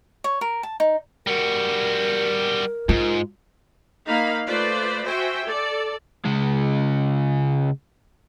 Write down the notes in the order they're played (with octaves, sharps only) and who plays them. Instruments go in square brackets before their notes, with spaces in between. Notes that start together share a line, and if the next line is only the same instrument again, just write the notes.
[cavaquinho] C#5
A#4
A5
D#4
[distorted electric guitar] G3 F#4 [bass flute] A#4
[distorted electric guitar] G#2 [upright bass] F4
[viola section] A#3 D#4 F5 B5
A3 F4 B4 C5 D5
F#4 C5 E5 G5 G#5
A4 D5
[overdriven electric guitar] C#3 G#3